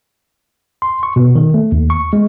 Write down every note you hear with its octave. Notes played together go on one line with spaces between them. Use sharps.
C6
C#6
B2
D#3
A3
D#2
C#6
G#3